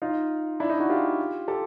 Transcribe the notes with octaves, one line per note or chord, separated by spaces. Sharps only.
D#4 F4
D4 E4
D#4
E4 F#4
F4 G4
G4 A4